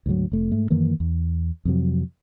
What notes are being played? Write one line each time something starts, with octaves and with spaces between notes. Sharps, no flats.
D2 G#2 E3 F#3
F1 A3
G#2 A3
F#2 D#3 E3 A#3
E2
F2 C3 F#3